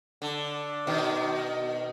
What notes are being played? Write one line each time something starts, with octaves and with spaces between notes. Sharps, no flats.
D3
B2 D#3